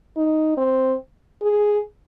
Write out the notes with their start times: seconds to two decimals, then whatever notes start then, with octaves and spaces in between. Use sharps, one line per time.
0.17 D#4
0.57 C4
1.42 G#4